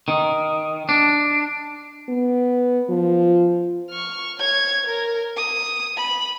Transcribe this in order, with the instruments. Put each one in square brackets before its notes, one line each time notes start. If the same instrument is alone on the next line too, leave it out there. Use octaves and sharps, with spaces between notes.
[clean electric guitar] D#3
D4
[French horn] B3
F3
[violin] C#6 F6
C#5 G#6
A#4
D#6
B5